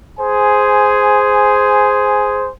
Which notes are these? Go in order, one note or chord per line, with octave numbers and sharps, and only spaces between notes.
G#4 C5 G#5